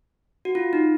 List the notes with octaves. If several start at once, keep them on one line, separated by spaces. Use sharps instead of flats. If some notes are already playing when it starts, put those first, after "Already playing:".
F#4
F4
D#4